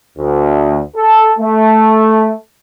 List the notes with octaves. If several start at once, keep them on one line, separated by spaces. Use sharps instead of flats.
D2
A4
A3